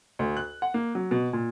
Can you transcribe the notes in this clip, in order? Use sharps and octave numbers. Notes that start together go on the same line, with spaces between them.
D2
F#6
F#5
A#3
F#3
B2
A#2